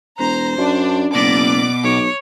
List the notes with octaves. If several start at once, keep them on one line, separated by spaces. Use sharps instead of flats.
E1 C5 A#5
F#2 D4
F#1 B2 D5 D6
B1 C#5